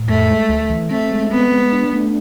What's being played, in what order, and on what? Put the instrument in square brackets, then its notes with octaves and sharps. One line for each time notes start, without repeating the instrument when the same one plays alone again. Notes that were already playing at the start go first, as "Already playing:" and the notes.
Already playing: [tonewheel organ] A2
[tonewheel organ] F2 [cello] A3
[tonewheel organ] G#3
D2
E3
[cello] A3 [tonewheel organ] C4
[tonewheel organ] G#3
[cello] B3 [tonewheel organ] C4
[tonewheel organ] G#3
D4
A3